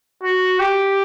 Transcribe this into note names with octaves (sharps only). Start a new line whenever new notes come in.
F#4
G4